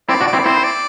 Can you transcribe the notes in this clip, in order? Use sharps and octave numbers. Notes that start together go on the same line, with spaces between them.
C4 E4 D5
D4 F#4
D5
C4 E4
C4 E4 C5
D5